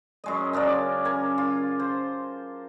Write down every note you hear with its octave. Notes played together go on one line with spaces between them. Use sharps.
F#2 G#3 D#5
C#3 D4 A#4 D5
A#4 G#5
F4
C5